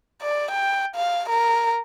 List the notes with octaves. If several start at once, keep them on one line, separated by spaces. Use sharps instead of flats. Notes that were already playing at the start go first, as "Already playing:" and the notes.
D5
G5
F5
A#4